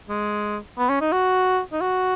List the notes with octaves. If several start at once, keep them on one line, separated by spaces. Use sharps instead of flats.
G#3
B3
C#4
D#4
F#4
D#4
F#4